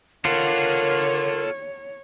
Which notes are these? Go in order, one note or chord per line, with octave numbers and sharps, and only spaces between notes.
F4 A4 A#4 C#5 F#5